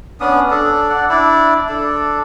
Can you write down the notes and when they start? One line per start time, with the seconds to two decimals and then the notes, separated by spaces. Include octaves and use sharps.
0.20 B3 C#4 D4 D#6
0.50 D4 A4
0.89 D5 F#5
1.09 D4 E4 D5
1.69 D4 A4